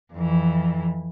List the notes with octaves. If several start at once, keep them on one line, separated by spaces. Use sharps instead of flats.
F2 E3